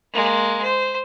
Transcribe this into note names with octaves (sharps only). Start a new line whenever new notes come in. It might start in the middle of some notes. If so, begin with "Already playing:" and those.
G#3 A#3
C5